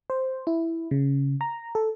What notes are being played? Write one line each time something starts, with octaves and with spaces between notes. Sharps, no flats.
C5
E4
C#3
A#5
A4